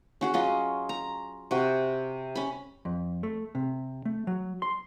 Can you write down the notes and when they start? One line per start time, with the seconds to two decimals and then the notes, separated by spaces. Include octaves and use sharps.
0.21 C#4 F#4 G#4
0.34 F#3 C#4 F4 D#5
0.89 A#5
1.51 C3 F#4
2.35 C#4 B5
2.85 F2
3.23 A3
3.55 C3
4.05 A3
4.27 F#3
4.62 C6